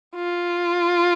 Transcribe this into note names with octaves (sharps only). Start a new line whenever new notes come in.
F4